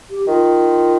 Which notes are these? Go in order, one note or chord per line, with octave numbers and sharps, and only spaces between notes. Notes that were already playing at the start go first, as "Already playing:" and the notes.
G4
D#3 F4